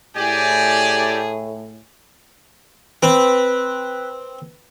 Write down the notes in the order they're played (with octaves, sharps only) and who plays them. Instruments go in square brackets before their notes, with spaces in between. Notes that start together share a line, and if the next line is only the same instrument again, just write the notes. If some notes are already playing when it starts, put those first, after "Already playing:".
[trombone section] A2 [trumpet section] G4 D5 [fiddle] G#4 [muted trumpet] G#5
[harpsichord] C4 [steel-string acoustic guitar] B4